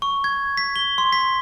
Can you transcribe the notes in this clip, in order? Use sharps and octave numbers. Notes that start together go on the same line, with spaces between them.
C#6
G#6
B6
G7
C6
B6